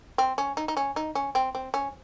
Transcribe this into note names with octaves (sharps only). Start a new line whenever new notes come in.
C4
C#4
D#4
D#4
C#4
D#4
C#4
C4
C4
C#4